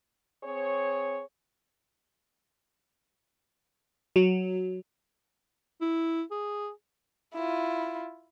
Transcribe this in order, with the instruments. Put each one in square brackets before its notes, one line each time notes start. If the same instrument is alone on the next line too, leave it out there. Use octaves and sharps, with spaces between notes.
[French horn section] C4 G#4 C#5
[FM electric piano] F#3
[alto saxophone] E4
G#4
[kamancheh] E4 F4